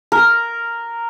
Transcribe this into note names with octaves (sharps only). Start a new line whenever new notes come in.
A#4